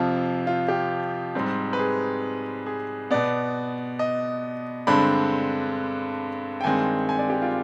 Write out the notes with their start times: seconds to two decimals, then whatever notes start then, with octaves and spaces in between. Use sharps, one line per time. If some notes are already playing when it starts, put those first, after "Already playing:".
Already playing: F2 C3 F3 F4
0.47 F4
0.68 G4
1.35 G#2 G3 C4
1.73 B4
1.79 G#4
2.66 G#4
3.11 B2 B3 D5
3.99 D#5
4.87 G2 D3 G#3 C4 B5
6.61 G5
6.64 G2 D#3 G#3 C4 G#5
7.09 G#5
7.19 D5
7.30 G4
7.42 F4